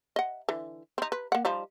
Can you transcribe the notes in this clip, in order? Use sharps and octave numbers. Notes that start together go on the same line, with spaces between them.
D#5 F#5
D3 E3
C4 D#4
B4
A#3 F#5
F3 G3 D#4